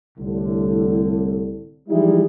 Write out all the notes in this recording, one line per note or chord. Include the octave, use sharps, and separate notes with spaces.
C2 A2 D3
E3 F3 G3 G#3 D#4 E4